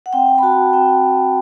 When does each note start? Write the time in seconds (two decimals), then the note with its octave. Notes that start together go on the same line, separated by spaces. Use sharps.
0.06 F#5
0.13 C4 G5
0.38 B5
0.43 F#4 A5
0.73 C4 G5